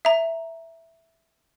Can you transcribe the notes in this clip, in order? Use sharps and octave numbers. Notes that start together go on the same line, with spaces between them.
E5 A#5